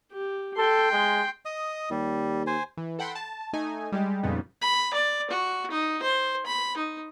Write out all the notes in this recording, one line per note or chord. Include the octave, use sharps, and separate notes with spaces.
G4
A4 G5 C6
G#3
D#5 D#6
D#2 G3
C5 G#5
E3
A4 F#5 G5 B5 C6
A5
A3 D#4 G#5
G3 G#3 G4
F2 A#2 C#3 G3 B3 D#4
B5
D5
F#4
D#4
C5
B5
D#4